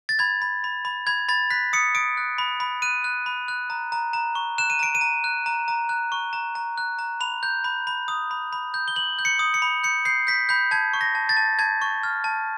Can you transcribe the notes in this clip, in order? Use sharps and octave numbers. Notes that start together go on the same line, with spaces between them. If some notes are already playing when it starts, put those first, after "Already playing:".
A6
B5 G#6
B5
B5
B5
B5 G#6
B5 A6
F#6 B6
D#6 C#7
D#6 D7
F#6
B5
B5
F#6 D#7
F#6
B5
F#6
A#5
A#5
A#5
C#6
F#6 E7
D#7
A#5 D7
D#7
A#5
F#6
A#5
A#5
F#6
C#6
A#5
A#5
F#6
A#5
B5 F7
G6
B5
B5
D#6
B5
B5
G6
G7
G6 F#7
G6
C#7
D#6
C#7
B5
G6 C#7
G6 C7
G6 B6
B5 G6
A5 G#6
C#6
A#6
A5
A6
A5
A5 G#6
C#6
F6
A5